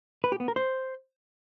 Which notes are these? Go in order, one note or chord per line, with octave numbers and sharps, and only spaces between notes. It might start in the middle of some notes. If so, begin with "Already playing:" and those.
B4
G4
B3
A#4
C5